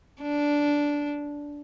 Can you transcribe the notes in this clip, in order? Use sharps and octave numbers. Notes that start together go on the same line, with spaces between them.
D4